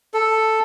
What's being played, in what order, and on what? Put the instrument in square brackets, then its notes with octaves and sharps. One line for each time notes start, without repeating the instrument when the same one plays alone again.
[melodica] A4